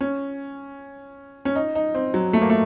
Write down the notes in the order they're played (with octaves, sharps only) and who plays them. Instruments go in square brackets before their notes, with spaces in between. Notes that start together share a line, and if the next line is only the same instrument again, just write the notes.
[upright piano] C#4
C#4
D#4
D#4
C4
F#3
A3
A#3
A3